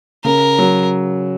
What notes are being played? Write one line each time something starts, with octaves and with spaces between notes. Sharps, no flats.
C#3 A#4
F#3